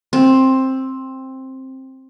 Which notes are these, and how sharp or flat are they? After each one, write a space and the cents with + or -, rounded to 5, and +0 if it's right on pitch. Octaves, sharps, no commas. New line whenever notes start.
C4 +10